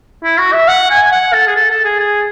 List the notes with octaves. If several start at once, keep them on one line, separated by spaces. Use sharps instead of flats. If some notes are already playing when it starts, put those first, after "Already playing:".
E4
F#4
E5
F#5
G#5
F#5
A4
G#4
A4
A4
G#4
G#4